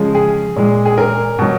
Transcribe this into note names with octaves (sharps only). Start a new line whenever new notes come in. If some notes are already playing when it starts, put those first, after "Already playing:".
Already playing: C#3 F3 G#3
G#4
A#2 G#3
G#4
A#4
B2 F#3